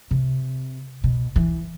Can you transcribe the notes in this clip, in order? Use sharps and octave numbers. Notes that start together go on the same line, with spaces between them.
C3
B2
E3